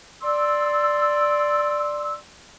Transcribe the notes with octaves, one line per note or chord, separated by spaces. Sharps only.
D5 C6 E6